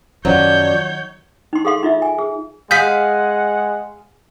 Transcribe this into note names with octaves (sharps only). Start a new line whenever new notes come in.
F#2 D#3 F3 F#3 C#5 D5 G6
D#4 C6
G#4 A4 F5 C6
D#4 F4 E5
G#5
G#4
G#3 G#4 F5 F#5 G6 B6